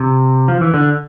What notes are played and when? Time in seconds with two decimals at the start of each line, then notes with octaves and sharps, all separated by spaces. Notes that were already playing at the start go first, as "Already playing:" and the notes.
Already playing: C3
0.48 F3
0.61 E3
0.74 D3